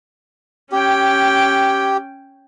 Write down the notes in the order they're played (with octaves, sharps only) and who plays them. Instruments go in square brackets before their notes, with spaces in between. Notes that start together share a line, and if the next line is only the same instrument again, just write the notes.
[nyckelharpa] C#4 G5 [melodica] G4